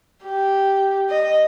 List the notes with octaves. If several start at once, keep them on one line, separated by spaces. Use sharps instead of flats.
G4
D#5